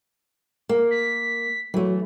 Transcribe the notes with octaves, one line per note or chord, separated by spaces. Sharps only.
A#3
B6
E3 F#3 A3